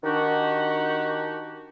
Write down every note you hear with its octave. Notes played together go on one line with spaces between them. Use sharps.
D#3 D4 F#4 G4